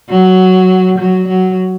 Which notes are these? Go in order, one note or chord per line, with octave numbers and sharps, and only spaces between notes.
F#3
F#3
F#3